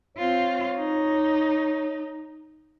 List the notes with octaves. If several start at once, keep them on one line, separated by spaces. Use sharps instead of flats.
C4 F4 C#5
D#4